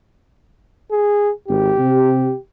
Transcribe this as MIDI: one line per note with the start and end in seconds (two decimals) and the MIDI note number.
0.91 1.31 68
1.48 1.73 32
1.48 2.38 67
1.79 2.31 48